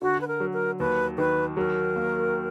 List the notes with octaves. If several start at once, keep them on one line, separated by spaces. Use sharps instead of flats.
D3 F#4
B4
A#4
F#3
A#4
D#2 B4
D#3 B4
F#3 A#4
A#3